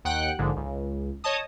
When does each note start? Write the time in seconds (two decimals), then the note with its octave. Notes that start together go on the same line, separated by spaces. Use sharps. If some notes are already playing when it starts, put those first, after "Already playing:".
0.05 D#2 F#5 G5 F#6
0.39 A#1 G#2 D3
0.56 C#2
1.24 C#5 D#5 A5 D#6